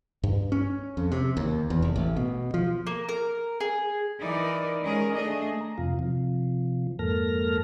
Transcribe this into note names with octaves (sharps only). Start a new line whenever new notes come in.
G2
C#4
F2
C3
D#2
E2
F1
A1
B2
F3
A#3
A#4
G#4
E3 D#4 A#4 D5
D#3 G#3 C#4 G#4 A#4
A3 D4 G#4 D#5
A#5
F2 C3 F4
C3 F3
F2 G#2 A#3 A4 F6 A#6